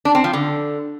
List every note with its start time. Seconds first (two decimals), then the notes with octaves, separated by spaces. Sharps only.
0.05 D4
0.15 C4
0.24 F3
0.33 D3